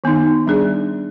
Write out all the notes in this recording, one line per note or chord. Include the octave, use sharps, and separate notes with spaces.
D#3 B3 D#4
G3 D4 G#4 D5